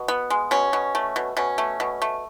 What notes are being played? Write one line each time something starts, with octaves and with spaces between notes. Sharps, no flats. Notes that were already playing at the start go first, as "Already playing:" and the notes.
Already playing: B2
B3
G#3
B2 C#4
B2
A3
B2
B2 C#4
A3
B2
A3